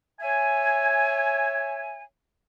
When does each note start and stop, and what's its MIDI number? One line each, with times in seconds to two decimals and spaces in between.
0.20 2.02 73
0.20 2.02 76
0.20 2.02 80